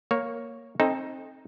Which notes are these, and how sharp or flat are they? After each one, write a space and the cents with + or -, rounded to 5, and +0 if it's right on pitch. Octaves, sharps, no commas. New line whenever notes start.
A#3 +0 C#5 +0
C4 +25 D#4 +0 A4 +0